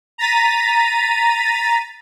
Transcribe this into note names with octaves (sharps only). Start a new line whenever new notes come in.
A#5 A6 B6 D#7